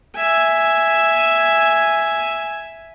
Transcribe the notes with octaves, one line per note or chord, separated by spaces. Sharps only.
E5 G#5